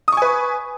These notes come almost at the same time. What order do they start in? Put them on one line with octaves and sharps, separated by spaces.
D#6 C#6 G#5 B4